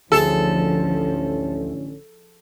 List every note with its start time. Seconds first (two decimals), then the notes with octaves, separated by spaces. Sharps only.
0.12 A1 D2 D3 F3 C#4 G#4 A4